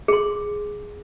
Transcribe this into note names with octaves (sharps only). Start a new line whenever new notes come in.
G#4 C6